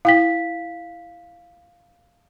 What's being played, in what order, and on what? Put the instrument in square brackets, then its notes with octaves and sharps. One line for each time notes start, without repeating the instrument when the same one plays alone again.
[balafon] E4 G5 [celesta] F5 B6